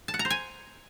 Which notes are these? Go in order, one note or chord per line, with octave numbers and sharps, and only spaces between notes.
A5
F#5
A#5
C5
G#5